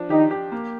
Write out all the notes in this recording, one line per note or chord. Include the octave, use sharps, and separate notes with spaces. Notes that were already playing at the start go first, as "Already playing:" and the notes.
Already playing: F3 D4
D#3 D#4 G4
G4
A#3